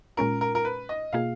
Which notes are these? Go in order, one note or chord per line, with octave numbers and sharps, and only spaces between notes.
A#2 G#3 C#4 F4 A#4
A#4
A#4
B4
D#5
B2 A#3 F4 G#4 F5